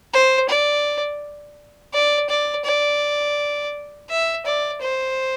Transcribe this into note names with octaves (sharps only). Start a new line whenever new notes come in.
C5
D5
D5
D5
D5
E5
D5
C5